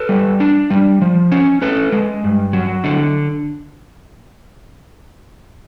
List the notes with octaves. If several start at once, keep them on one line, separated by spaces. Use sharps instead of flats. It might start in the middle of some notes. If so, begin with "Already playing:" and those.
Already playing: A4 B4
G3
D4
G3
F3
C#4
C#4 A4 B4
G#3
G2
F#3
D3 A4